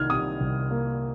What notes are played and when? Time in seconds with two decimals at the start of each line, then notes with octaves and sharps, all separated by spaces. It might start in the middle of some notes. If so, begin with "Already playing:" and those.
Already playing: C2 D#3 A#3 F6 G#6
0.10 C3 D#6
0.41 C2
0.71 A#3